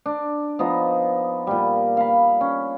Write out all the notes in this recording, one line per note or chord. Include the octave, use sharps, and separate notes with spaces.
D4
F3 B3 D#4 D#5
A#2 G3
F5 B5
C#4